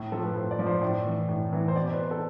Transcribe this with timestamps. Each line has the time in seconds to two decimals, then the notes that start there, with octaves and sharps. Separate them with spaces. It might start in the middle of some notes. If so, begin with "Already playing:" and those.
Already playing: A2
0.12 F3 A4
0.23 B4
0.35 A2 C5
0.51 D5
0.59 F3
0.66 C5
0.82 A2 D5
1.06 E3
1.29 A2
1.53 E3
1.68 C5
1.76 B2 D5
1.88 C5
1.93 B4
1.99 C5
2.11 A4